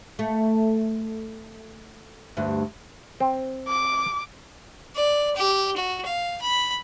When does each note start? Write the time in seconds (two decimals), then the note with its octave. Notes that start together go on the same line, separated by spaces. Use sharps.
0.19 A3
2.37 D2 G2
3.20 C4
3.68 D6
4.96 D5
5.36 G4
5.76 F#4
6.06 F5
6.41 B5